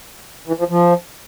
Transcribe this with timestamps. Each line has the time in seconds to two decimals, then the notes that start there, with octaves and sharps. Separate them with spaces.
0.47 E3
0.59 F3
0.70 F3